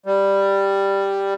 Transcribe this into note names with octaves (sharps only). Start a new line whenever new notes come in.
G3